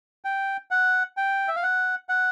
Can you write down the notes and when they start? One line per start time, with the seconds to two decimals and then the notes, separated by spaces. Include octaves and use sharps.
0.25 G5
0.71 F#5
1.17 G5
1.48 E5
1.56 F5
1.63 F#5
2.09 F#5